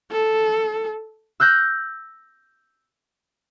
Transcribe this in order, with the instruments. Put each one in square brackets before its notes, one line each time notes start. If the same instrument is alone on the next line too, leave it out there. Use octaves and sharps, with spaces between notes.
[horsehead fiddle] A4
[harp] E6 F#6 G6 A#6